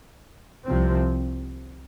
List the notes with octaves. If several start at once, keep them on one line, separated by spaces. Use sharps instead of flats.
C2 C3 F3 C4